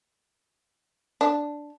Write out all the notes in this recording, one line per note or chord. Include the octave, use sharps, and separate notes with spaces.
D4